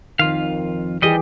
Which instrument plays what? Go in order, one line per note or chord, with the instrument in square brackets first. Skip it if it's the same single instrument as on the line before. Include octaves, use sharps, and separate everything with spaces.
[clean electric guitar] F2 F4 F5 [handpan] D#3
[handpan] E3 G4 G#4 [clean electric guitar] G3 D#5